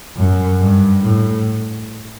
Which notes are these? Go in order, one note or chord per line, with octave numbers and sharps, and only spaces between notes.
F#2
G2
A2